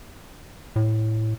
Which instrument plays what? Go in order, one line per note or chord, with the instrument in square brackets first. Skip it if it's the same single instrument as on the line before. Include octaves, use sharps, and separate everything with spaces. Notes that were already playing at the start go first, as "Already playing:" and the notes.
[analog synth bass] A2